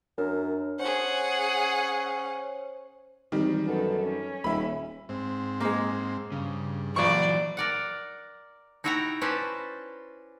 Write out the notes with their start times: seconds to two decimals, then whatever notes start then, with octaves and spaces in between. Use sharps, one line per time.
0.18 F#2 D4 A#4
0.80 C#4 G#4 C5 F#5
3.32 G#1 D#3 E3 G3
3.65 F#2 B3 A4
4.01 C#4
4.44 D#1 E5 B5
5.09 G#2 C4
5.60 G#3 A#3
6.32 G2 C#3
6.96 A#1 E3 F#3 D5 C#6
7.57 A#4 D5 F#5
8.84 D#4 E4 F#4 E5 G5 A#5
9.21 C#4 B4 C5 D5 E5 A5